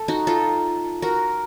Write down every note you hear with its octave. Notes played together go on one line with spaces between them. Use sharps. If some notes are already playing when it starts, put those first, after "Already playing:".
Already playing: A4
D#4 F#4
F4 A4
F#4 A#4